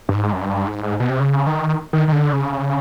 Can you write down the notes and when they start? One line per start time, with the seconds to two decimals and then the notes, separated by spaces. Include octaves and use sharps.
0.09 G2
0.15 G#2
0.33 F#2
0.41 G2
0.67 G#2
1.00 B2
1.09 C3
1.20 C#3
1.47 D#3
1.93 D#3
2.08 D#3
2.12 D3
2.33 C#3